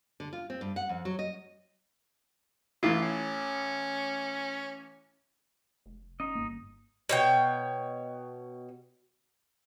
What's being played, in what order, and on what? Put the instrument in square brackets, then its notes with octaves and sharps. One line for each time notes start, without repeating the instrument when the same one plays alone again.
[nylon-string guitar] D3
F4
C4
G2
F#5
F2
F#3
D#5
[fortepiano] A1 E3 E4 [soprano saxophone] F4
[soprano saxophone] C#4
[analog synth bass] F1
[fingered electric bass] C#4 [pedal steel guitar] D#4 D#5
[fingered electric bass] G1 A#3
[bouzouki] B2 C#5 G5